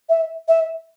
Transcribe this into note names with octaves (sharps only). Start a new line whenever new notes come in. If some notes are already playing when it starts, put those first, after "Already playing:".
E5
E5